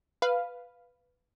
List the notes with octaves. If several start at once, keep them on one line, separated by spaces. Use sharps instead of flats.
B4 F5